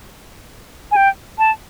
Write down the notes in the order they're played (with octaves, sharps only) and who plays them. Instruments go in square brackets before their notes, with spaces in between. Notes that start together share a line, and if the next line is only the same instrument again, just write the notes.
[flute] G#5
G5
A5